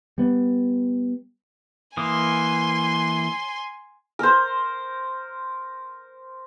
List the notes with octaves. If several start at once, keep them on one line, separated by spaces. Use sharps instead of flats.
G3 B3
E3 A#3 G#5 C6 D#6
A#4 C5